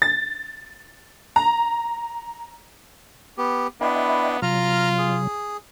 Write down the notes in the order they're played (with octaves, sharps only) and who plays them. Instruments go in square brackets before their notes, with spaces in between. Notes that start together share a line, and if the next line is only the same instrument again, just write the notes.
[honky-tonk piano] A6
A#5
[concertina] B3 G4
[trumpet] B3 [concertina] D4 E4 [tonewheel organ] D#5 E5 G5
[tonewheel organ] C3 F#3 [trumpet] F4 [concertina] A#5 F6
[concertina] G#4